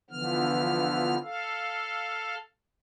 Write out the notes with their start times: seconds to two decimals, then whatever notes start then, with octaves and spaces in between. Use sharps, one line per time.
0.10 D3 E3 F3 B3 F6
1.23 A4 F5